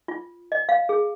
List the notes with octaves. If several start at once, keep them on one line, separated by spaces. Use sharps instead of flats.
F4
D#5
F5
G#4